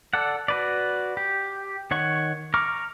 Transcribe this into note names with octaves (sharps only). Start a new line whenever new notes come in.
A4 D5 F#5
F#4 B4 D5
G4
D#3 C#5 F#5 C#6
A#5 C#6 D6 F6